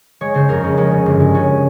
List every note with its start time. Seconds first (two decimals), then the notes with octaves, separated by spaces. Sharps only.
0.21 G#3 C#5
0.34 C#3 C5
0.49 F2 A#4
0.63 G#3 C#4
0.77 G#3 C#4
0.91 C#3
1.06 G1
1.20 G#3
1.34 C#3 C#4